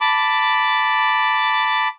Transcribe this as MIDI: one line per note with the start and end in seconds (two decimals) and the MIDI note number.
0.01 1.88 81
0.01 1.88 83
0.01 1.88 86